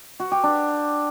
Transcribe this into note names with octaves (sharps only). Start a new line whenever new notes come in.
F#4
G4
D4